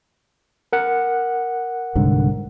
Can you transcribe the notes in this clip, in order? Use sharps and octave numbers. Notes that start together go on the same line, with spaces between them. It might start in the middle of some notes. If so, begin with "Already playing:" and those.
A#4 F#5
C2 G#2 D3